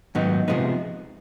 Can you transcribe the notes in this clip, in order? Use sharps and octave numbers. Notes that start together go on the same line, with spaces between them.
G#2 D#3 F#3 B3 D#4
C3 F3 G#3 B3 D#4